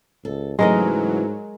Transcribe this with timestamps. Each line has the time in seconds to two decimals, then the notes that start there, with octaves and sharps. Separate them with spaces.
0.25 C#2 A4
0.59 G#2 C#3 E3 F#3 G#3 A3 A#4 D#5